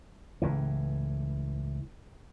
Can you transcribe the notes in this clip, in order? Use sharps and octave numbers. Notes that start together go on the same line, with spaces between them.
C#2 A2 E3